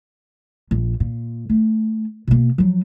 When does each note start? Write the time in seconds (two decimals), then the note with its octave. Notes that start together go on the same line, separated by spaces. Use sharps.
0.71 A#1
1.00 A#2
1.49 A3
2.27 B2 A#3
2.58 F3 F#3